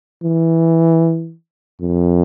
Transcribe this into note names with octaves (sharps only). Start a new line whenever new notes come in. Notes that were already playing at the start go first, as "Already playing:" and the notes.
E3
F2